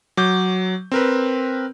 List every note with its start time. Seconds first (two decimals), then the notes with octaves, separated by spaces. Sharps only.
0.17 F#3 D6 G6
0.92 C4 A#4 B4